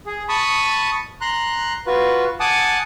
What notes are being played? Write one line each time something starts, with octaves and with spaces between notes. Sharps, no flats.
G#4
A5 B5 C#6 D#6
A#5 C6 F#6
F4 F#4 B4
F#5 G#5 A5 D6 D#6